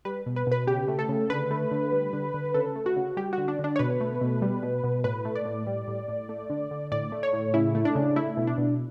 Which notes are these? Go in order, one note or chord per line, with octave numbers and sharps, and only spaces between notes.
G3 B4
B2
B4
B2 B4
C#3 G4
A3
A4
C#3
D3 B4
A3
D3
G3
D3
D3
C#3 A4
A3
F#4
C#3
G3 G4
F#4
D3
D4
D3
D4
C#5
B2 B4
A3
B2
G3
B2
B2
A2 B4
A3
D5
A2
G3
A2
A2
A3
D3
D3
A2 D5
A3
C#5
A2
C#3 E4
A3
D4
C#3
A3 E4
B2
D4
B2